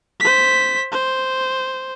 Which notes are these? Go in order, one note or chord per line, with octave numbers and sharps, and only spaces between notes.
C5 B6
C5